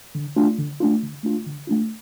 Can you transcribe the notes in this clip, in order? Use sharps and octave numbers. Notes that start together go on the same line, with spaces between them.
D3
A3 D4 F4
D3
A3 D4 F4
D3
A3 D4 F4
D3
A3 D4 F4